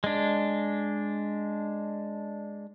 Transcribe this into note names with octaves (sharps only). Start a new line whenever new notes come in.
G#3 D4